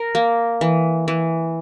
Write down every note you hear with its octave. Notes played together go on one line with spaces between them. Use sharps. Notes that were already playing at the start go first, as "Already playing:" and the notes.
Already playing: A#4
A#3
E3
E3